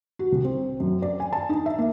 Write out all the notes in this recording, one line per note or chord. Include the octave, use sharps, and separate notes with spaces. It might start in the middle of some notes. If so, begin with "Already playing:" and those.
F#4
C2
C4
F#2
D5
G#5
A5
D#4
E5
A#3